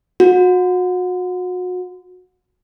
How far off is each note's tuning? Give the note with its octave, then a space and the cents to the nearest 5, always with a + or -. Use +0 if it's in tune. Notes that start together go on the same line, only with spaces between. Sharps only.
F#4 -30